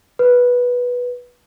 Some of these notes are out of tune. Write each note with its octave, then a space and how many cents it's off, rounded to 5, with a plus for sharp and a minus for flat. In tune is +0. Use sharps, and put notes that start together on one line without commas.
B4 -10